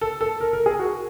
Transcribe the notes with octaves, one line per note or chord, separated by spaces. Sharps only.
A4
A4
A#4
A#4
G#4
F#4